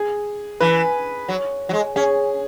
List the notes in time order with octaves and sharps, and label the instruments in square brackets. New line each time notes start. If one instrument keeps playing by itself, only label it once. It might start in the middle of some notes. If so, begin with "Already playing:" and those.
Already playing: [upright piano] G#4
[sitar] E3 [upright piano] B4
[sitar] F#3
F#3
G#3
[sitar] C#4 [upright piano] G#4